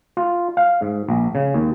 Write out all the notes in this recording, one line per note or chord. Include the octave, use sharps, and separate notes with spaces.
F4
F5
G#2
A#1
C#3
D#2